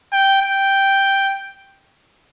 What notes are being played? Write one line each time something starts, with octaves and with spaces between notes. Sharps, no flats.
G5
G5